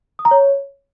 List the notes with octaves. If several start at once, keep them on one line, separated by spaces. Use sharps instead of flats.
D#6
A#5
C#5